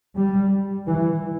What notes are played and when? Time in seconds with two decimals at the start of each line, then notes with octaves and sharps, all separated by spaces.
0.16 G3
0.87 E3